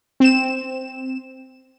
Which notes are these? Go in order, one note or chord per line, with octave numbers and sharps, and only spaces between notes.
C4 E7